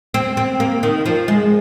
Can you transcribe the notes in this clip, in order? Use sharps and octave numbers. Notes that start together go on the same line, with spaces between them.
C4
C4
A#3
D#3
F3
G#3